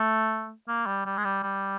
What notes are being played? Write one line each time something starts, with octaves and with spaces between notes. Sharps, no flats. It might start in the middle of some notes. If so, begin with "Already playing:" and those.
Already playing: A3
A#3
G3
G3
G#3
G3
G3